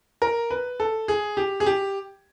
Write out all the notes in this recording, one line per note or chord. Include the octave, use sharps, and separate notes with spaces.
A#4
B4
A4
G#4
G4
G#4
G4